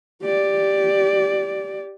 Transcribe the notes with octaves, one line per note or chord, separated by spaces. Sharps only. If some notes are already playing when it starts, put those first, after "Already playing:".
G4 D5